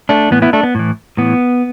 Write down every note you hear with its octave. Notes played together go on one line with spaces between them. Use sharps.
A3 D4
A2 E3 B3
B3 E4
A3 D4
B3
A2 E3
A2 E3 B3